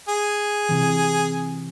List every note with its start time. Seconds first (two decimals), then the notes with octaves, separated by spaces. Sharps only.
0.09 G#4
0.69 C3 E3